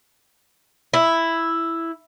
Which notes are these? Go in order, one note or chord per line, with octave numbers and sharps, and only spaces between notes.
E4